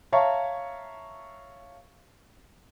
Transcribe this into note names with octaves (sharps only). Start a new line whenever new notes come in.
C#5 E5 F5 A5 A#5 C#6